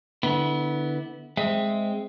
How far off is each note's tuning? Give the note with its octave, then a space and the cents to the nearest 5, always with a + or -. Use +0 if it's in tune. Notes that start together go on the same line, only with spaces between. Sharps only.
D3 +0 B3 +0 E4 -25
G#3 +0 C4 +0 E5 +5